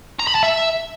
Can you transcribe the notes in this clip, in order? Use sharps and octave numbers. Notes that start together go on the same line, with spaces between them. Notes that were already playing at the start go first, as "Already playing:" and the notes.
A#5
B5
A5
E5